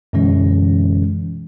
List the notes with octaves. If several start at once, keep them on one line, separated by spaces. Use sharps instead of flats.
F#2 B2 D3 E3 G#3 C#4